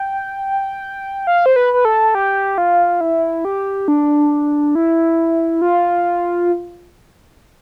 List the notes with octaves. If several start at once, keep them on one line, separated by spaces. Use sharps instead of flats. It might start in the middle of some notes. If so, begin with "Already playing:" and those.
Already playing: G5
F5
C5
B4
B4
A4
G4
F4
E4
G4
D4
E4
F4